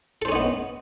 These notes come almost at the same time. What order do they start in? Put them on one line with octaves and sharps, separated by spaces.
A4 C5 C#4 D#5 B3